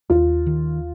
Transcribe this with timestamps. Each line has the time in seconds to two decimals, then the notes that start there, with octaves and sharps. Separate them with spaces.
0.10 D#2 F4
0.46 D#3